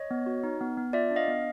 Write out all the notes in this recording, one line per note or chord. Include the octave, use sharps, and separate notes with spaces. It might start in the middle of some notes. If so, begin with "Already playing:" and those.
Already playing: C#5 D#5
B3
F#4
D#4
B3
B3
F4 D5 E5
D4
D#5 F5
B3